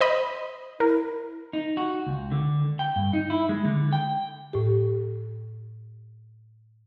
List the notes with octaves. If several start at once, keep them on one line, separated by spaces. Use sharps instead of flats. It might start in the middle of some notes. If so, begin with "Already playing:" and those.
C5 D#5 B5
E4 A#4
D#4
F#4
C#2
D3
G5
G2
D#4
E4
G#3
D3
G5
A2 G4